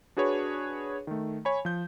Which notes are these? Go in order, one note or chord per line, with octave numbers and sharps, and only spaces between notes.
D4 F#4 G#4 B4 C#5
D#3 A3
C#5 G#5 B5
F3 G6